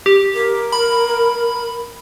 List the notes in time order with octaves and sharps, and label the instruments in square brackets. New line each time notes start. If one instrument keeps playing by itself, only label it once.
[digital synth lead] G4
[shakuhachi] A#4
[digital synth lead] B5